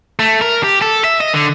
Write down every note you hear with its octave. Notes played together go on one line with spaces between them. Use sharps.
A3
A#4
G4
A4
E5
D#5
D3